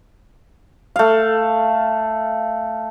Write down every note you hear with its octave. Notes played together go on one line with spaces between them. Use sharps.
A3 F5